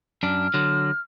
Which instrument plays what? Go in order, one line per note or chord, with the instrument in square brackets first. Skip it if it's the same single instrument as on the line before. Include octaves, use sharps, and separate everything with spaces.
[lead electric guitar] F#2 D4 [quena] F6
[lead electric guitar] D3 F#3